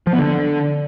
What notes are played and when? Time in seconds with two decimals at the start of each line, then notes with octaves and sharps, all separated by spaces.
0.07 F3
0.13 B3
0.19 D3